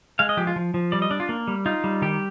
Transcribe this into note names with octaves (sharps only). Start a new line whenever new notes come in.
G#3 F5
D#5
F3 G4
F4
F3
F3
G3 D5
D#5
D4 D5
F4
A#3
G3
D#4 F4
G3
D#3 G4